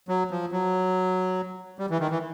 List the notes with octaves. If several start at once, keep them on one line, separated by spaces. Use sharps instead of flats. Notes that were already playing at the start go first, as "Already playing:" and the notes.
F#3
F3
F#3
G3
E3
D#3
E3